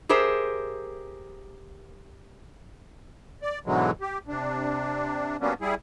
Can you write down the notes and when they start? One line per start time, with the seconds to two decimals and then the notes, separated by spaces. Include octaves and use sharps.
0.09 G4 G#4 A#4 C5 E5
3.42 D5
3.66 G#2 B2 D3 E3 F#3 G#3
4.01 G4
4.28 C3 D4
5.41 F#3 G3 A#3 B3 C#4 D4
5.61 G3 E4 G#4